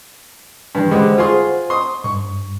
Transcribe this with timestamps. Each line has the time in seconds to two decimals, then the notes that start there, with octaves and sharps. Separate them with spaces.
0.75 G2 E3 D4
0.91 D3 G3 G#3 C5 F#5
1.18 F4 G#4 C6
1.70 C6 D#6
2.04 G2 C#6